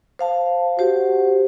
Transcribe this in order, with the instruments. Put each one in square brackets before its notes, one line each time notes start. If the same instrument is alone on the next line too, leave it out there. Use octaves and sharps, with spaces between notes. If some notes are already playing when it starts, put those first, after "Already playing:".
[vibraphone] C5 F5 A5
[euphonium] F#4 [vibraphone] G4 C5